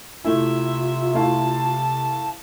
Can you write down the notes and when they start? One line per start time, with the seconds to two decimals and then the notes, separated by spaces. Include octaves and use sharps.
0.25 C3 A3 E4 F4 E5
1.14 A3 E4 F5 A5